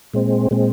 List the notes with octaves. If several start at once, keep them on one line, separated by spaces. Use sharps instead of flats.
A#2 G#3 C4
A#2 G#3 C4